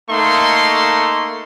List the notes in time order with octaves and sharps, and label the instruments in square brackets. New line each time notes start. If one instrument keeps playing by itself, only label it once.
[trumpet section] A3 A#3 D#4 C6 C#6